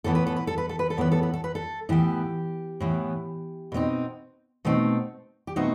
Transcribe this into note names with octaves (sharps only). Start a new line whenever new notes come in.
A2 E3 B3 A4
B4
A4
B4
A4
B4
A4
B4
A4
A2 E3 B3 B4
A4
B4
A4
B4
A4
A2 E3 B3 G4
A2 E3 B3
B2 A3 C4 D#4
B2 A3 C4 D#4
G4
B2 A3 C4 D#4 F#4